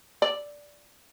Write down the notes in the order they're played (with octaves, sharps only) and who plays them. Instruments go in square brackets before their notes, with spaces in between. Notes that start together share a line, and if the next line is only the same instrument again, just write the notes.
[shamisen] D5